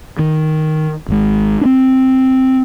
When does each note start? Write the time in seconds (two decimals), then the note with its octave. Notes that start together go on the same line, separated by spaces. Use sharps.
0.19 D#3
1.08 G#1 G#2
1.61 C4 D4